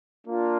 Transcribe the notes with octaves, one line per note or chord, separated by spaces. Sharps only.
A#3 D4 F4